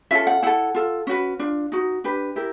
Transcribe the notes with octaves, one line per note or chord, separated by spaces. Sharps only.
C#4 F4 A4 E5
F#5
E4 A4 F#5
F4 A4
C#4 F#4 B4
D4 F4
D#4 F#4
D4 G4 B4
E4 G4 A#4